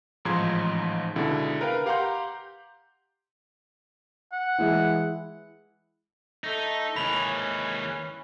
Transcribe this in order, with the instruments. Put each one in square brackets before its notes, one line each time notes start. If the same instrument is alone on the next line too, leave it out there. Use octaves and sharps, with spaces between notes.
[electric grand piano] A1 G#2 F3 D#4 C6 G#6
C#2 B2 D3 E4
A#4 B4 F5 G5
G4 F5 F#5 A#5 C6 G6
[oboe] F#5
[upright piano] E3 G#3 E4
[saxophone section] A3 [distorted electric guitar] D#4
[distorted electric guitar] D#2 G#3 [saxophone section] E3 C#4 [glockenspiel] B5 F#7